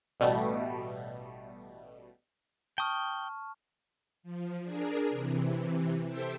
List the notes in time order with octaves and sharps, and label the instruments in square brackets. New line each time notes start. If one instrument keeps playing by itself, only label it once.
[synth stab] A1 B2 G3 A3
[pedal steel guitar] G5 D#6 [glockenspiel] A5 C#6 F6
[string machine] F3
D4 G#4 A#4
C3 E3
G4 A4 C5 E5 G5 E6